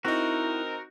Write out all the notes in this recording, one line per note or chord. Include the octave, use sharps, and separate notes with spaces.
C4 D#4 E4 F#4 A#4